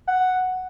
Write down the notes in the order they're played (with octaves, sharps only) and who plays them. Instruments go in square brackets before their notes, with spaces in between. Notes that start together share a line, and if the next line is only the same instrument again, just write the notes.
[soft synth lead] F#5